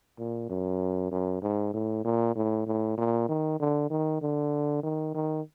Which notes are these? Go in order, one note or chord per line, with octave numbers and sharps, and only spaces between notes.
A#2
F#2
F#2
G#2
A2
A#2
A2
A2
A#2
D#3
D3
D#3
D3
D#3
D#3